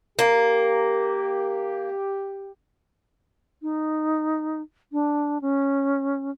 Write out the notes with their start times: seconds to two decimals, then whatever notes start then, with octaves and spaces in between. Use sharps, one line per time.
0.19 A#3 G4
3.62 D#4
4.92 D4
5.41 C#4